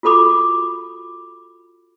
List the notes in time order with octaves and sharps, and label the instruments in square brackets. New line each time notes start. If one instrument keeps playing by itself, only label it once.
[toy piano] F4 F#4 A4 B5 D6